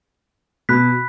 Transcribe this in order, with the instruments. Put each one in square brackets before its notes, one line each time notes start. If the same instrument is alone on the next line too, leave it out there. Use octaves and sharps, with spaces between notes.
[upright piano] B2 [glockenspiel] B5 F#6 B6